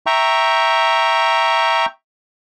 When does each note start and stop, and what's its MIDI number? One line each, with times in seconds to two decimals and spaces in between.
0.07 1.86 76
0.07 1.86 79
0.07 1.86 82
0.07 1.86 85